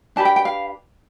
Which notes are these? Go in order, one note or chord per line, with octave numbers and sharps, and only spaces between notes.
D4 G4 B4 A5
G5
G5
F5